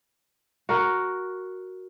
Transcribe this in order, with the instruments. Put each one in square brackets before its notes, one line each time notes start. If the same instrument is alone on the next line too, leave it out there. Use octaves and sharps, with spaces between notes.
[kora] F#4 A#4